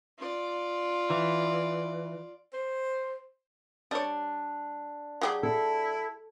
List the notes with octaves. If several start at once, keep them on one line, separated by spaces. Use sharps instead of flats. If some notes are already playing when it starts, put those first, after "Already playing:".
F4 D5
E3
C5
G3 D4 C#5
F#3 G4 G#4
E4 A4